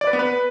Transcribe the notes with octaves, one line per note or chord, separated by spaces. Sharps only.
D5
B4
B3
B4